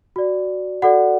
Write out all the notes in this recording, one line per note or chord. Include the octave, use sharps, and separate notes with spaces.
F#4 D5
F#4 A4 D5 F#5